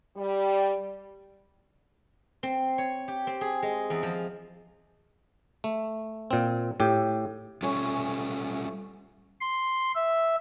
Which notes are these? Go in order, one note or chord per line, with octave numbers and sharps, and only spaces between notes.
G3
C4
C#5
G4
C4
G#4
G#3
E2
F3
A3
A#2 C4
A2 G4
G3 A3 C#4 F4 C#5 G#5
C6
E5